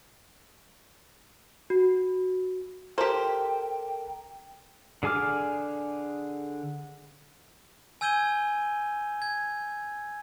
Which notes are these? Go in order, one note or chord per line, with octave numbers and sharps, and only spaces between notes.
F#4
G4 A4 A#4 C5 G5
D3 G#4 G#5 D6 F6
G#5 E6 G6 G#6 D#7 G7
G#6